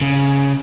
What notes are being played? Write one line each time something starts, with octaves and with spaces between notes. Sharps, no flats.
C#3